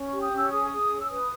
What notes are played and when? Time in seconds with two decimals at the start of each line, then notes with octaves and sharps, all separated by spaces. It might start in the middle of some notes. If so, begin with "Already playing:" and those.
Already playing: C#4
0.08 C#6
0.13 G4
0.22 D#6
0.32 C#4 E6
0.51 G#4 D#6
0.71 G#4
0.91 C#4
1.00 E6
1.09 B4 D#6